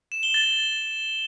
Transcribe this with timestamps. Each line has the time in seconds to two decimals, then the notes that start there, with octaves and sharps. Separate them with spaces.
0.12 E7
0.23 G7
0.34 A6